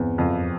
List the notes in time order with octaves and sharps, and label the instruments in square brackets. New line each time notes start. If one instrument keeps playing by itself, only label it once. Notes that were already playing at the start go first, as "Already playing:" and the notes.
Already playing: [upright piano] E2 [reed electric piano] G2 C4
[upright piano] F2 [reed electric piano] F3